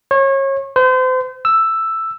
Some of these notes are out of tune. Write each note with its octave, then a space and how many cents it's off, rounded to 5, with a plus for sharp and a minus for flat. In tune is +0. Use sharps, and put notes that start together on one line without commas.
C#5 -30
C5 -35
E6 +5